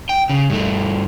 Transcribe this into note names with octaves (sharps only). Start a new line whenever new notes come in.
G5
C#3
G2 A3